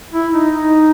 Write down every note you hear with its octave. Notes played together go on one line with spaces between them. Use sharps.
E4
D#4
D#4